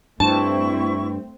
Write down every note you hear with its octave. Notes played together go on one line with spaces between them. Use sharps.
G2 A3 C4 E4 A5 C#6